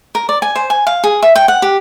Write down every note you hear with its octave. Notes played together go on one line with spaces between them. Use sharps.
A#4
D5
G#5
C5
G#5
F5
G#4
E5
G5
F#5
G4